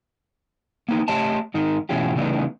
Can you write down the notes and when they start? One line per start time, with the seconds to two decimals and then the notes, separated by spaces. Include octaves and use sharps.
0.89 A#3 B3 D#4
1.08 A3 G4 C#5 D#5 A5
1.54 G#2 D#3 D#4 A#4
1.89 B2 E3 A3 C#4 F4 G4
2.15 C#3 E3 G3 A3 B3 D#4